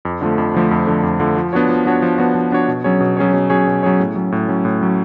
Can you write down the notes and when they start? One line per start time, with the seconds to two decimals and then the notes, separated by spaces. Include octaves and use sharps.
0.05 F2
0.21 D3 F3 A3
0.38 F2
0.54 D3 F3 A3
0.71 F2
0.87 D3 F3 A3
1.03 F2
1.20 D3 F3 A3
1.37 F3
1.53 B3 D4 F#4 C#5
1.69 F3
1.86 B3 D4 F#4 C#5
2.02 F3
2.18 B3 D4 F#4 C#5
2.35 F3
2.51 B3 D4 F#4 C#5
2.68 B2
2.84 F#3 C#4 G#4 C#5
3.01 B2
3.17 F#3 C#4 G#4 C#5
3.33 B2
3.50 F#3 C#4 G#4 C#5
3.67 B2
3.83 F#3 C#4 G#4 C#5
4.00 A2
4.16 F#3 C#4
4.32 A2
4.48 F#3 C#4
4.65 A2
4.81 F#3 C#4